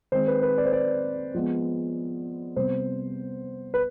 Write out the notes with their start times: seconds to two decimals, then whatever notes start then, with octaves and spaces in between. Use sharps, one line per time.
0.12 D#3 G#3 C4 C5
0.28 B4
0.42 B4
0.58 D5
0.65 C5
0.73 D5
1.34 F3 G#3 B3
2.56 C3 G3 B3 C5
3.74 B4